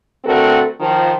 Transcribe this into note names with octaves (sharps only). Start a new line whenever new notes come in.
D3 A3 C4 F#4 A4 A#4
D#3 F3